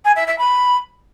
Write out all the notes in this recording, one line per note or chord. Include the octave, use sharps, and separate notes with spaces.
G#5
E5
E5
B5